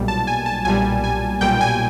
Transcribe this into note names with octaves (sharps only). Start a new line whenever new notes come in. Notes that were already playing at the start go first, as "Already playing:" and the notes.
Already playing: B1 A#2 G3
A5
G#5
A5
B1 A#2 G3 G#5
G#5
B1 A#2 G3 G5
G#5